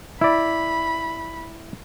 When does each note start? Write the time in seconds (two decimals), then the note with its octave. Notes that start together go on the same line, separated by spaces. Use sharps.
0.21 E4 D5 B5